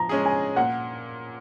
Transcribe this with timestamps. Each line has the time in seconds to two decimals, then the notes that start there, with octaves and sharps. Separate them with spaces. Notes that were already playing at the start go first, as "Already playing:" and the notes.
Already playing: F3 A#5
0.09 G#3 C#4 G#4
0.26 G#5
0.56 A#2 F#5